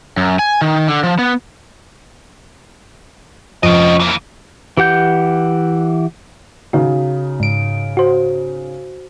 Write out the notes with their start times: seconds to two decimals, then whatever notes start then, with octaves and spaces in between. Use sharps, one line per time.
0.17 F#2
0.39 G#5
0.61 D#3
0.88 D3
1.03 F3
1.19 B3
3.63 F2 C#4 D#5
4.00 E3 A#3
4.77 E3 G4 F#5 G6
6.73 C#3 D#4 F#4
7.40 G#2 D7
7.97 F#4 C5